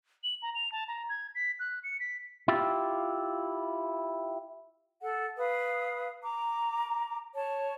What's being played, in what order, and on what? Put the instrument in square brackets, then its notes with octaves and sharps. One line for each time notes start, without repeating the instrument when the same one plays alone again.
[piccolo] F#7
A#5
F7
A5
A#5
G#6
B6
F#6
C#7
B6
[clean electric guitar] E4 F4 G4
[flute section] A4 F#5
B4 F5 D#6
A#5 D6
C#5 A5